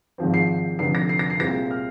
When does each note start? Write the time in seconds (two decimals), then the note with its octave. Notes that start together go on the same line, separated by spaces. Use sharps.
0.18 G#1 G#2 F3 C4
0.34 C7
0.79 F1 F2 D3 C7
0.95 A#6
1.09 C7
1.19 A#6
1.30 C7
1.40 C2 A#2 G#3 C4 A#6
1.71 F6